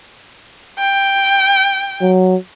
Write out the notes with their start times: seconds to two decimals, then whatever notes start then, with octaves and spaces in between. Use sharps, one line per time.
0.79 G5
2.01 F#3